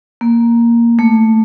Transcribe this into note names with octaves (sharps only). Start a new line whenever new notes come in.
A#3
A3